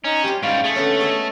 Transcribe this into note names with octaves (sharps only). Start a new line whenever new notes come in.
C#4 D#4
G3 F4 G4 G5
G#2 G3 C#4 F5
A3 G#4
D3 B3 C#4 C#5
G#4 A4 D#5